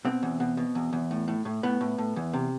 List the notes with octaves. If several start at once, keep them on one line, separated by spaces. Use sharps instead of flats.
B2 C4
E2
B2
B2
E2
E2
A2
A2
A2
A2 B3
A2
A2
E2
C3